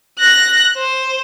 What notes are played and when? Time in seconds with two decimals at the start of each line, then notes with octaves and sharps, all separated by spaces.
0.19 F#6 A#6
0.77 C5